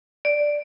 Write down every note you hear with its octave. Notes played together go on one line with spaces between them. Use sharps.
D5